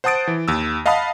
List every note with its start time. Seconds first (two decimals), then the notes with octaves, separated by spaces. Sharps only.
0.04 C5 F#5 A5 D#6 A6 D7
0.27 E3
0.48 D#2 E6
0.86 D#5 F5 F#5 A5 B5 D#6